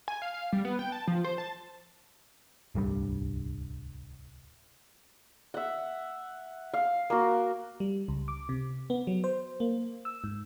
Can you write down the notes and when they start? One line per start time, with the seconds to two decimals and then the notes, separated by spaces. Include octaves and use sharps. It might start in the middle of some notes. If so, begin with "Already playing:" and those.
0.08 G#5
0.22 F5
0.34 F5
0.53 G3
0.65 B3
0.79 G5
0.92 A5
1.08 F3
1.24 C5
1.38 A5
2.75 D1 C2 G2 G3
5.54 E5 F#5
6.74 F5
7.10 A#3 F#4
7.80 G3
8.08 C#2
8.28 D6
8.49 C3
8.90 B3
9.07 F#3
9.24 C5
9.60 A#3
10.05 E6
10.24 G#2